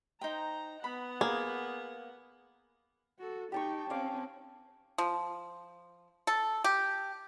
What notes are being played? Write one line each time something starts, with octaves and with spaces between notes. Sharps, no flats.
D#4 C5 G5 A#5
B3 F#5 B5
A#3 G#4
F#4 A4
D#4 G4 G5 A5 C#6
C4 C#4 F5 D6
F3
A4
G4